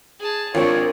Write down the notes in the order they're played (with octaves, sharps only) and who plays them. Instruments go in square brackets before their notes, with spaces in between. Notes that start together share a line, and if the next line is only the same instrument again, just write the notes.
[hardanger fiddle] G#4 A5
[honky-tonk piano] G#1 F4 [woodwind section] F2 C#5 [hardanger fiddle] C4 D4 [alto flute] A#4